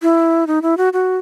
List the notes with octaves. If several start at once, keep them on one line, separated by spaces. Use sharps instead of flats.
E4
D#4
E4
F#4
F#4